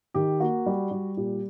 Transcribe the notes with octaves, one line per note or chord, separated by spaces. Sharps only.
D#3 G4
A#3 F#4
G3
G3
A#2 G4